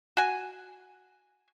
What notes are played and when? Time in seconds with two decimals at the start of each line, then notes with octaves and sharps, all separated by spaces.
0.17 F#4 G#5